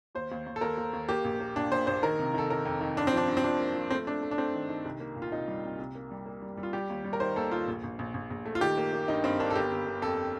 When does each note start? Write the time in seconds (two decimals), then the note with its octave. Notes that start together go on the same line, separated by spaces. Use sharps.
0.15 D#2 C5
0.31 D#2
0.46 D#2
0.56 A4
0.61 D#2 A#4
0.77 D#2
0.93 D#2
1.09 A#3 G4
1.25 A#1
1.40 A#3
1.56 A#2 D4
1.71 A#2 C5
1.87 A#1 C5
2.03 D#3 A#4
2.19 C3
2.34 D#3 A4
2.50 D#3 A#4
2.65 F2
2.81 D#3
2.97 G2 D4
3.07 C4
3.13 F3 D4
3.28 G2
3.37 C4
3.44 F3 D4
3.60 A#3
3.75 F3
3.90 A3 C4
4.07 A3 D4
4.23 A3
4.31 D4
4.38 A3 C4
4.54 D#3
4.69 D#3
4.85 C2
5.00 A#3
5.16 A#2
5.22 F4
5.32 C2 D#4
5.48 G3
5.63 C2
5.79 C2
5.95 A#3
6.11 G3
6.26 A#3
6.42 G3
6.57 G3
6.63 F4
6.73 G3 G4
6.89 D#2
7.04 G3
7.13 A#4
7.20 D#3 C5
7.36 D#2 A4
7.52 D#2 F4
7.68 A#1
7.83 A#1
7.99 A#1
8.14 A#1
8.30 A#1
8.46 A3
8.55 F4
8.61 D#3 G4
8.78 A#3
8.93 A#3
9.08 G2 D#4
9.24 G2 C4
9.40 A#3 D4
9.51 A4
9.55 G1 G4
9.71 G1
9.87 G1
10.02 F2 A4